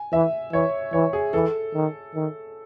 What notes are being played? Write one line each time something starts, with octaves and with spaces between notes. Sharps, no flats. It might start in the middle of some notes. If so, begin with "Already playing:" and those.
Already playing: G#5
E3 E5
E3 C#5
E3 C#5
G#4
E3 A4
D#3
D#3